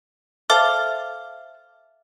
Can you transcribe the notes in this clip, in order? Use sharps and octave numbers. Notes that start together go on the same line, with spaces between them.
A4 C5 E5 F5 D6 F6